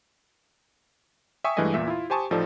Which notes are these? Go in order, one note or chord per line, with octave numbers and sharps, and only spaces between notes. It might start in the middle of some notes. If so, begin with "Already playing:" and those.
E5 G5 G#5 C#6 D#6
G2 E3 G#3 A3 D#5 G#5
E2 A#2 E5
E4 F4
G4 C5 G#5 A5 C#6 D#6
A1 F3 D#4 A4 D5